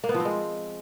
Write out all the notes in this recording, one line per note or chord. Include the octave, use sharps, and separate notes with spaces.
A#3
B3
F3
C4
G#3